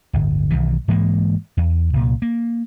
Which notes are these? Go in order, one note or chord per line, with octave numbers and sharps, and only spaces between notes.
D1 G1
B1 D#3 E3
G#2 E3 G#3 A#3
E2
C2 A#2
A#3